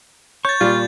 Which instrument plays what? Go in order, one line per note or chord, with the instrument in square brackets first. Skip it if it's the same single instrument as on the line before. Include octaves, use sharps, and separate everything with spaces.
[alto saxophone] C#5 [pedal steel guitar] C#6 [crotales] G6 A6
[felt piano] A#2 G3 [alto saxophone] F4